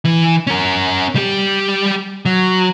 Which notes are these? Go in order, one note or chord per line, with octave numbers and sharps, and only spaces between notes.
E3
C#4 A#4
G3 G4
F#3